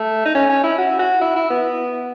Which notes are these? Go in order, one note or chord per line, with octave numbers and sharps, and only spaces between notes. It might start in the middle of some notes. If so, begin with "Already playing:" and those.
Already playing: A3
D#4
C#4
C#4
E4
F#4
F#4
E4
E4
B3